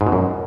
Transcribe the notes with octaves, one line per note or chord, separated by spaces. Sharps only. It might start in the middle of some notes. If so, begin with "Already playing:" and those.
G#2
B2
F#2